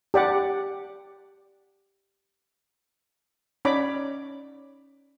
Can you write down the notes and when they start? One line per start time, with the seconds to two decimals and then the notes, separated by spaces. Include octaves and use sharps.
0.14 G4 D5 F#5
3.65 C#4 D#4 C#5 D5 B5 D6